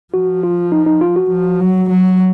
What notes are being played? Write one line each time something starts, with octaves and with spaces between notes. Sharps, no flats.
F3 F#4
F4
D#4
D#4
F4
F#4
F3
F#3
F#3